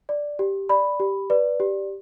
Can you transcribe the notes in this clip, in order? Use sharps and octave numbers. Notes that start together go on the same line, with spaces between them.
D5
G4
D5 B5
G4
B4 D5
G4